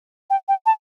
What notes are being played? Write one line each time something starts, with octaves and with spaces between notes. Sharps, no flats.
G5
G5
A5